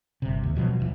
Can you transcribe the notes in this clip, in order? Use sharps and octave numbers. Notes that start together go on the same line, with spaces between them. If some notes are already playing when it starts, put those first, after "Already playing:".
G1 C3
D#2
E1 B2 F3 F#3
D#1 C2 E3